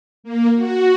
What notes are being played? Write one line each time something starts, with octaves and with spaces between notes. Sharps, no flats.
A#3
F#4